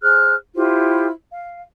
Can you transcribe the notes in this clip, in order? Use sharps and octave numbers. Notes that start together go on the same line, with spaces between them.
G#4 C5 F6 F#6
E4 F4 G4 C5
F5